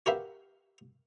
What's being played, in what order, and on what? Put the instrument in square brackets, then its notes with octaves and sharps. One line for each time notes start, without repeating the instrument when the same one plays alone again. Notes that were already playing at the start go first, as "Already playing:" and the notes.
[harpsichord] F#4 G4 A#4 B4 E5 F5